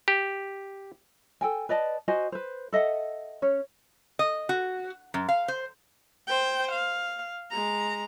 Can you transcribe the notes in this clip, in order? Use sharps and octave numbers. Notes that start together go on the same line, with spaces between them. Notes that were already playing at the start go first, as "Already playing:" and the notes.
G4
A4 G5 G#5
B4 D5 D#5 A5
F#4 C5 D#5 G#5
B4 C5
A4 D#5 E5 F#5
C#4 C#5
D#5
F#4
F#2
F5
C5
C5 G5
F5
G#3 A#5